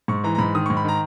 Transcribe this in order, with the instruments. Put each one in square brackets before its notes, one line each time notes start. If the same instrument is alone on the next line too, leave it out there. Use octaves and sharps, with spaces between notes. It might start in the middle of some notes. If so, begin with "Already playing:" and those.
[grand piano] G#2 C#6
E3 A#5
A#5
G#2 B5
D#3 D#6
G#2 C#6
B5
D#3 A#5